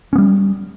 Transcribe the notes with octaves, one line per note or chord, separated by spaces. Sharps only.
G3 B3 C#4